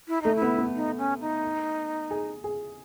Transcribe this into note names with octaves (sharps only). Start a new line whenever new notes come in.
E4
A3 D#4
E4
B3
B3
D#4
C#4
D#4
G#4
G#4